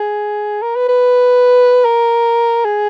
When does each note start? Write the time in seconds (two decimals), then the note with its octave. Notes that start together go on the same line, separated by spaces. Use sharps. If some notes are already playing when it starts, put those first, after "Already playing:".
Already playing: G#4
0.62 A#4
0.76 B4
0.89 B4
1.85 A#4
2.65 G#4